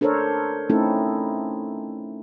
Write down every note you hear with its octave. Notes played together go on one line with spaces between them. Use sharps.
D4 A4 A#4 C5 C#5
A3 C4 C#4 D#4 E4 A4